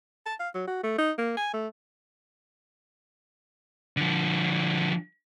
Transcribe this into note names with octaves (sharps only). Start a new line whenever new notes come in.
A5
F5
F#3
F#4
A3
D#4
A#3
G#5
A3
D3 F3